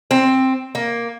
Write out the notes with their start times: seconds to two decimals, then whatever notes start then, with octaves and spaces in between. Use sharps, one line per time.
0.11 C4
0.75 A#3